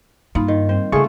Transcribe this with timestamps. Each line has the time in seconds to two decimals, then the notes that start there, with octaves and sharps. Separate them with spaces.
0.35 G2 A#3 D#4 F4 B5
0.48 D#3
0.69 G3 C4 C5
0.92 C#3 A3 F4 G#4 C#6